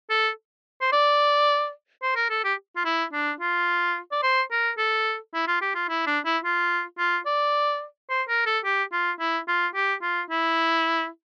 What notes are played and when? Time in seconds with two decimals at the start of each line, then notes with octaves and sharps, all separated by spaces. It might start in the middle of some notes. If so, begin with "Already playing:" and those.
0.10 A4
0.81 C5
0.93 D5
2.03 C5
2.16 A#4
2.30 A4
2.44 G4
2.76 F4
2.85 E4
3.13 D4
3.40 F4
4.12 D5
4.23 C5
4.51 A#4
4.78 A4
5.34 E4
5.47 F4
5.61 G4
5.75 F4
5.89 E4
6.06 D4
6.25 E4
6.44 F4
6.99 F4
7.26 D5
8.10 C5
8.28 A#4
8.46 A4
8.64 G4
8.92 F4
9.20 E4
9.48 F4
9.75 G4
10.02 F4
10.30 E4